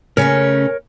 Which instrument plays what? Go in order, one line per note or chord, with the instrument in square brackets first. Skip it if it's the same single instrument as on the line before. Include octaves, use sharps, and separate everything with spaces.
[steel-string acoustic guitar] C#3 A3 C#4 [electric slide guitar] A#4 C#5